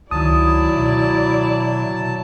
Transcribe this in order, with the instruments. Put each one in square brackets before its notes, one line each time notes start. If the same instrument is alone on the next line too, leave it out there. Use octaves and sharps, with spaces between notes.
[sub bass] C#2 [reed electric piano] D#3 D#6 [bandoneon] F#3 A5 [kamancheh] E4 D5
[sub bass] B2